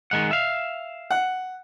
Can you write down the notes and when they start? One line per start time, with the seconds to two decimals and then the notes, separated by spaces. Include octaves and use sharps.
0.11 D#3 G#3 F#5
0.31 E5 F5
1.11 F#5